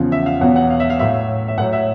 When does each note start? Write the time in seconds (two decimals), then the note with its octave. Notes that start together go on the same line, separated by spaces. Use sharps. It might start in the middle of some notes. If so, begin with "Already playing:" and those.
Already playing: E2 C#3 F3
0.12 E5
0.26 F5
0.41 E2 B2 F#3 F#5
0.56 F#5
0.70 F5
0.80 E5
0.90 F5
0.99 A2 F#3 E5
1.48 E5
1.58 A2 F#3 F#5
1.73 E5